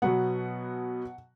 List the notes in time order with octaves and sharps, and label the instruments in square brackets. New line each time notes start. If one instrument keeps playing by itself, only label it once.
[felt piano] B2 F#3 B3 F#5